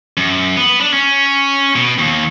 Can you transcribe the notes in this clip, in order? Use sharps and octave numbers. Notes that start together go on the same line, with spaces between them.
F#2
B3
D4
C#4
B2
D#2